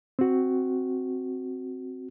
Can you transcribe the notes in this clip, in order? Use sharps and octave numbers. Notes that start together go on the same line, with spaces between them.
C4 F#4